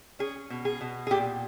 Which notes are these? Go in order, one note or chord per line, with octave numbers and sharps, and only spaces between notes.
C#4 G#4
B2
G#4
B2
G#4
A#2 G4